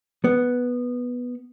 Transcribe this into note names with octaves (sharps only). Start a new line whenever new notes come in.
B3